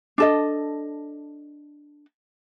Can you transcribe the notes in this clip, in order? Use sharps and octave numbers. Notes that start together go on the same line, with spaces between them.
D4 A4 D#5